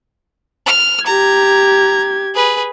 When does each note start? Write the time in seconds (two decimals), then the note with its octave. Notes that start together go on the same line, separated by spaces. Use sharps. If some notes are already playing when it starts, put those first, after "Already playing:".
0.66 F6
1.06 G4 A#5 G#6
2.34 G#4 B4